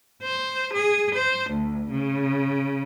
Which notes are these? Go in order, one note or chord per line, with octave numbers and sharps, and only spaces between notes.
C5
G#4
C5
D2
C#3